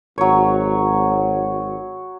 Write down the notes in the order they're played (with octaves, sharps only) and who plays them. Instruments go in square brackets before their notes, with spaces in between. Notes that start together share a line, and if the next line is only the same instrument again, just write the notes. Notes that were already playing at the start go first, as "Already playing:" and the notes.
[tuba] G#1 [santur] F#3 C#5